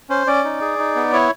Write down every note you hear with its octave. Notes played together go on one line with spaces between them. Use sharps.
C#4 C5
C#4 D5
D#4
G#4
D#4
B3
E4 C#5